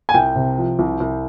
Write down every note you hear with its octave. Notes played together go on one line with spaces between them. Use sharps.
G#5
C2 G5
C3
F3
C2
C2